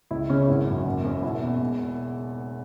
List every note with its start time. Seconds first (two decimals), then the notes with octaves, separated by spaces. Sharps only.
0.11 C#2 E4
0.30 C#3 C#4
0.48 G#1 E4
0.67 F#2
0.86 F#1
1.04 F#2
1.23 E1 E4
1.42 E2
1.60 E1